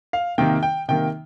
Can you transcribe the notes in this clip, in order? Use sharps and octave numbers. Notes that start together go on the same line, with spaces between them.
F5
C3 D#3 A#3 G5
G5
C3 D#3 A#3 G5